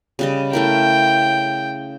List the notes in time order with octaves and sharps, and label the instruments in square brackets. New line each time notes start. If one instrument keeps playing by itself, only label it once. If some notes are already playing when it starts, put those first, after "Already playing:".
[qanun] C#3 G3 D#5
[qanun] A3 E4 A#4 [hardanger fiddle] G5